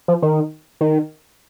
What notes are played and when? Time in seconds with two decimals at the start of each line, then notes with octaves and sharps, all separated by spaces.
0.08 F3
0.22 D#3
0.81 D#3